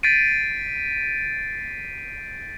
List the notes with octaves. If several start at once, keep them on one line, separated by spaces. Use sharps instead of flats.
G6 A6 B6 C7 D7 D#7